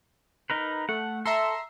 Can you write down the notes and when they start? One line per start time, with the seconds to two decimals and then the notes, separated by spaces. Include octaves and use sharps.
0.50 D#4 A#4 B4
0.89 A3 F#5
1.26 A4 E5 A#5 C6